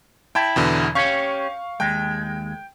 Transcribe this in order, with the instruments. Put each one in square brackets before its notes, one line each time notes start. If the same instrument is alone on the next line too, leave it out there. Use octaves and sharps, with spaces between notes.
[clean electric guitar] E4 [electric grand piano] G5 A5
[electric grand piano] E2 B2 D3
[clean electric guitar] C#4 G4 C#5 [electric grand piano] F5 C#6
[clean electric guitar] D#2 G#3 [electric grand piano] G5